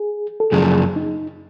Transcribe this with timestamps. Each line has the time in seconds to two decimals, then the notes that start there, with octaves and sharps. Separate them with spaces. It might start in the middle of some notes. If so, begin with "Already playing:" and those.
Already playing: G#4
0.40 A4
0.52 F#2 C#3 F3 G#4
0.96 D#4